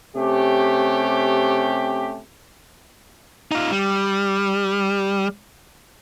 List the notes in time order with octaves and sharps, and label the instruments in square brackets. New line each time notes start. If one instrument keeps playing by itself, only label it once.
[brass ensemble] C3 A3 C#4 G4
[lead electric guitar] D#4 F4
G3